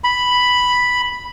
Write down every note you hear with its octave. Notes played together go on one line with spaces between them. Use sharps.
B5